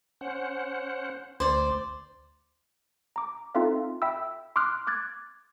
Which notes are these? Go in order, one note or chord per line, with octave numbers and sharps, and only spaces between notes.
C#4 C5 F#5
D2 C5 D5
A#5 D6
C4 D#4 F4 A4 E5 F5
E5 G5 B5 E6
C6 D6 D#6 F6 F#6
D6 F#6 G#6 A6